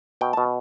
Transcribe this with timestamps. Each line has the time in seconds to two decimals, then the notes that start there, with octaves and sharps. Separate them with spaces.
0.21 B2 G5
0.33 B2 A5